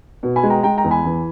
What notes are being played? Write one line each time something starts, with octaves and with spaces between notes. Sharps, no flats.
B2
G#5 B5
G#3
G5 A#5
G#3 G5 A#5
G5 A#5
E2
G#5 B5
E3